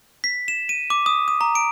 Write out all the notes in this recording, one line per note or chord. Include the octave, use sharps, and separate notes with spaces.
B6
E7
D#7
D6
D#6
D#6
A#5
D7